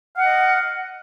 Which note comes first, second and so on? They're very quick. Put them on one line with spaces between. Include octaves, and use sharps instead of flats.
F5 F#5 D#5